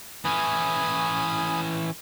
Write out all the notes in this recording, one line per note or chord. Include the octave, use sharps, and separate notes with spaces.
E3 C#4 G#5 B5 D#6